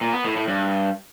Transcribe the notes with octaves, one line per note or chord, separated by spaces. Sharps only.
A#2
B3
A2
A2
G2